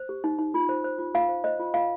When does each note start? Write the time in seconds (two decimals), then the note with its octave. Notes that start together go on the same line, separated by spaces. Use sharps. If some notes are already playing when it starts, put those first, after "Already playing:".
Already playing: C5
0.09 G4
0.24 D#4
0.39 D#4
0.54 F4
0.69 C5
0.84 C5
0.99 F4
1.14 F4 F5
1.29 C5
1.44 C5 D#5
1.59 F4
1.74 F4 F5